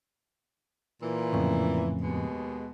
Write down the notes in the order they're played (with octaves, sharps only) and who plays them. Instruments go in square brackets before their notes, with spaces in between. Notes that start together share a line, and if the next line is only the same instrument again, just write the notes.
[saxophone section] A#2 E3
[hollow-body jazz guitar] F2 A2 C#3
[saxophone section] D#2 B2 G#3